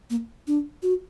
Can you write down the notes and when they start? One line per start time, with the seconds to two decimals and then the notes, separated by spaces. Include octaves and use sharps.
0.10 A#3
0.47 D4
0.83 F#4